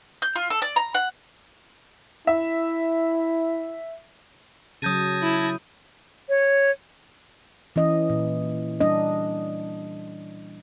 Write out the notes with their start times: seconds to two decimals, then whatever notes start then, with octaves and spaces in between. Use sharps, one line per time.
0.22 G6
0.36 F4
0.50 A4
0.62 D5
0.76 A#5
0.95 F#5
2.27 E4 E5
4.82 C#3 F#3 A5 D#6 G6 G#6 A#6 D#7
5.22 E4
6.29 C#5
7.76 E3 C#4 D#5
8.10 A#2
8.81 G3 D4 D#5